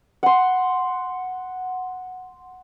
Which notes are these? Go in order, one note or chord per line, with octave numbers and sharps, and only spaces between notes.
F#5 C6